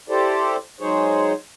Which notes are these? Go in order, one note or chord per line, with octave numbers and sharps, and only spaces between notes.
E4 G4 A4 C5 D5
F#3 G#3 D#4 G#4 C5 C#5